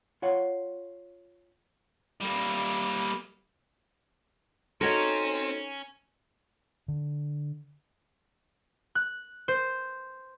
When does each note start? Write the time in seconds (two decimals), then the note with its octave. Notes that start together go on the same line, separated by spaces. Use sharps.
0.22 F4 C#5 F#5
2.21 G3 A#3
4.81 C4 C#4 D#4 F#4 A4 A#4 C#5
6.88 D3
8.95 F#6
9.48 C5